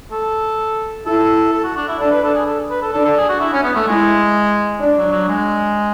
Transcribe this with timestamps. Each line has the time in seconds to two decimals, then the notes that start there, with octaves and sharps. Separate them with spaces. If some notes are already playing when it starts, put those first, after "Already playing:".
0.11 A4
1.06 E4 A4
1.53 A4
1.64 F#4
1.76 D4
1.88 E4
1.99 D4 A4
2.11 B4
2.23 A4
2.34 G#4
2.46 A4
2.70 B4
2.82 A4
2.93 D4 A4
3.05 A4
3.17 G#4
3.29 F#4
3.40 E4
3.52 C#4
3.63 B3
3.75 A3
3.87 G#3 E4
4.81 D4
4.97 F#3
5.12 F#3
5.28 G#3